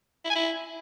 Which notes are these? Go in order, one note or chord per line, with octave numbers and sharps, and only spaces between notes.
E4
G#5
E4